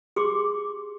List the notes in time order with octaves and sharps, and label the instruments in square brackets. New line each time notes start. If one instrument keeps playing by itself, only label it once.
[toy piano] G4 G#4 C6 D6